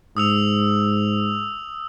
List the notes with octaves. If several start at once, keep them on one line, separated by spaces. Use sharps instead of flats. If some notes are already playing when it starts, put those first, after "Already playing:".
G#2 D#6 E6 F7